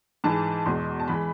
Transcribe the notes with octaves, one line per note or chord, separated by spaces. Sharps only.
G#2 E3 G#3 A5
E2 B2 G#3 C6
A5
E3 G#3 B5